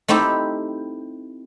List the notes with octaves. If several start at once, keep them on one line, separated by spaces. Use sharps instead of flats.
A3 C4 D#4 E4 G4